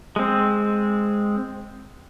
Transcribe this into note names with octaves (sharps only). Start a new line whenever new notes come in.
G#3 C4